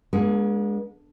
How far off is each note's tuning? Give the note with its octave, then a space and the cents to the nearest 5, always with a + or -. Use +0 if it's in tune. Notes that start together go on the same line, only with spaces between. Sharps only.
G#3 +0 B3 -45 D4 -5